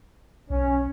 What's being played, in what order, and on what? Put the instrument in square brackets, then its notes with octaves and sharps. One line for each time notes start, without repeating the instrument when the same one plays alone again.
[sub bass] B1 [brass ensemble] C#4